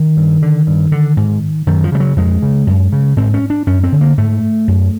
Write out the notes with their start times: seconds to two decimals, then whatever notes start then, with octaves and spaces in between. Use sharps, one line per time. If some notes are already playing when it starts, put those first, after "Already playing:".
Already playing: D#3
0.17 G2
0.42 D3
0.67 G2
0.92 D3
1.17 G#2
1.67 F#2 D#3
1.84 F3
1.92 C#3 G3
2.00 F#3
2.16 F2 G#3
2.42 C#3
2.67 F#2
2.92 C#3
3.17 G#2 C4
3.34 C#4
3.50 D4
3.67 F#2 C#4
3.84 C4
3.92 D3
4.01 A#3
4.18 G#2 A3
4.68 F#2